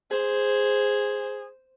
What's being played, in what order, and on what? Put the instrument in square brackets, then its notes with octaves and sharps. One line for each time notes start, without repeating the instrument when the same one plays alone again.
[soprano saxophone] G#4 [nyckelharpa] C5